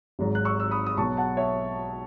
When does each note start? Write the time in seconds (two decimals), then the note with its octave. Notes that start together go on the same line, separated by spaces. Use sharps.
0.19 G#1 G#2 F#3
0.35 F#6
0.45 C#6 E6
0.60 E6
0.71 B5 D#6
0.87 D#6
0.97 B1 B2 F#3 A5 C#6
1.17 F#5 A5
1.37 C#5 E5